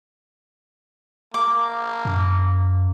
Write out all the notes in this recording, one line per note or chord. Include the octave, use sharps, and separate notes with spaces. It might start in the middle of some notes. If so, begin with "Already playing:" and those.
A#3 D6
F#2